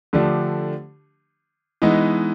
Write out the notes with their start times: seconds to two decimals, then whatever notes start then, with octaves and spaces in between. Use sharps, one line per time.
0.13 D3 F3 A3 D4 G4
1.82 E3 G#3 B3 D#4